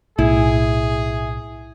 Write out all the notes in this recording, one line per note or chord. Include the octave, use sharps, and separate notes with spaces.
B1 A2 E4 G#4